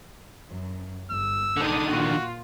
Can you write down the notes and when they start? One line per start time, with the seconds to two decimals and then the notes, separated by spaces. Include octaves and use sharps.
0.48 F#2
1.11 G1 E6
1.57 A#1 D3 D#3 D4 D#6
1.89 A#2 F4 F#4